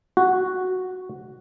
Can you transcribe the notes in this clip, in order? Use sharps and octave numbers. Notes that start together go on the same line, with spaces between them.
F#4